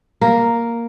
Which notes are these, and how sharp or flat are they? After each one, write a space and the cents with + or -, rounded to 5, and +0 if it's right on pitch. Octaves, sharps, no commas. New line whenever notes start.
A#3 +0 A#4 +0